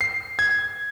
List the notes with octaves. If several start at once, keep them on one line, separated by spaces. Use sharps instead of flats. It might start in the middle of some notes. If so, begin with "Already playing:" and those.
C7
G#6